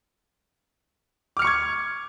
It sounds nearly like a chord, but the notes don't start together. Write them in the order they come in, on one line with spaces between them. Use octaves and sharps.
D6 F6 C#7 C#6 G#6